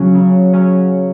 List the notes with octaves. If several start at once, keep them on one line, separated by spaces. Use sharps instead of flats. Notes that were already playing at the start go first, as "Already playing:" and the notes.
Already playing: C#3 F#3 C#4
C#3
F#3 C#4